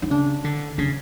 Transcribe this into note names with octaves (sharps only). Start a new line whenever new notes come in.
D#4
C#3 D4
D3
C#3 D4